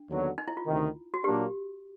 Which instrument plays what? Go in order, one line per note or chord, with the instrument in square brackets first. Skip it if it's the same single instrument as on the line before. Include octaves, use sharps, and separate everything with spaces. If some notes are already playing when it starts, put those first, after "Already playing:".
Already playing: [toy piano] D4
[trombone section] D#2 D3 F#3 B3
[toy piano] D#4
E4
F4
[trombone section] D2 C3 D#3
[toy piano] F#4
[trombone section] A#2 F#3 A#3 D4 [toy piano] G4